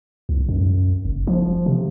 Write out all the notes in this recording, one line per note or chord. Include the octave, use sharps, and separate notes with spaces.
C2
F#2
F#1
F3
C3